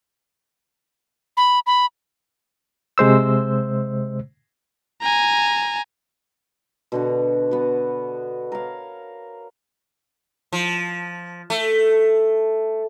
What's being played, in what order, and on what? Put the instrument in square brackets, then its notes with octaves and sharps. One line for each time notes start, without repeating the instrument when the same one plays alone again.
[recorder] B5
B5
[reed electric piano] C3 G#3 C5 E6
[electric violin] G#5 A#5
[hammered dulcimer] B2 D3 F#4
B3 F#4
A#4 C#5 F5
[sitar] F3
A3